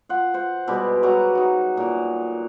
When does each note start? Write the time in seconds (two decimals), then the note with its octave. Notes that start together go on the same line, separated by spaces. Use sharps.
0.09 F4 F#5
0.34 C5 F#5
0.68 B2 G3 G#3 G4
1.03 F#3 G3 F#4 A#5
1.35 D#4 F#4
1.77 A#2 A#4